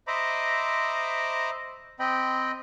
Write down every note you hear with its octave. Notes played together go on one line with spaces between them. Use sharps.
C5 D#5 E5 A#5 B5 D6
C4 D#5 G5 B5